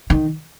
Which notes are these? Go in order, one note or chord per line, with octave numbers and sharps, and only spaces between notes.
D#3